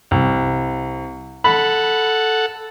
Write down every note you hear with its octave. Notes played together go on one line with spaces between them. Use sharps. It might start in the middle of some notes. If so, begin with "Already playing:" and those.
C2
A4 F#5 B5